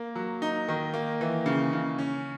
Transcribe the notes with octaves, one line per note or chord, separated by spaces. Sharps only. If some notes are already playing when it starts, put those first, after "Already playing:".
Already playing: A#3
F#3
D#4
D#3
A#3
E3
C#3
C#3
C#4